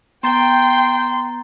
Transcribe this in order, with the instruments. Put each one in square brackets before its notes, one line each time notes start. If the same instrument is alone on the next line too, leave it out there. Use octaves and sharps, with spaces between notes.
[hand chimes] B3 A#5 A6 [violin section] G5 [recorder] C6